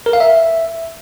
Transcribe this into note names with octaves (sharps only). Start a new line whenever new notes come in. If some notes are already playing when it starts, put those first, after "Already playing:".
A#4
F5
E5